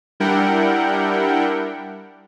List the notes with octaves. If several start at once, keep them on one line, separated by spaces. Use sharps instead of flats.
G3 D4 E4 A#4 F#5 G5